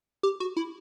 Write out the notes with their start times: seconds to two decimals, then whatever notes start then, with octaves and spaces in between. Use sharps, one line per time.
0.23 G4
0.40 F#4
0.57 E4